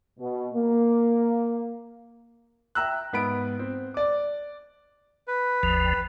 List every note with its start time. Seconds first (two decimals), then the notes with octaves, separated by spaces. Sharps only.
0.19 B2
0.53 A#3
2.75 E5 G5 A#5 E6 F#6
3.13 G#2 B3 B5 D7
3.59 C4
3.94 D5 D6
5.28 B4
5.63 G1 D#2 F3